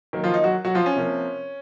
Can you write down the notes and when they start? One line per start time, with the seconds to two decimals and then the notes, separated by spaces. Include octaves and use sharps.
0.13 D#3 F#3 A#3
0.24 F3 F4
0.34 D#4
0.44 F#3 F#4
0.64 F#3 F#4
0.75 F3 F4
0.86 C#4
0.96 C3 F3 A#3